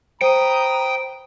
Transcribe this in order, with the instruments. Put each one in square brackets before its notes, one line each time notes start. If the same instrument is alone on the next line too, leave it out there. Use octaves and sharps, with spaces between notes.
[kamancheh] B4 D#6 [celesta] C5 [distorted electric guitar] G5 [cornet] A#5